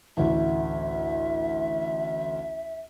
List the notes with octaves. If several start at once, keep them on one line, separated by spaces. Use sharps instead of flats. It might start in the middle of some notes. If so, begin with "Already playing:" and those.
A1 D2 E5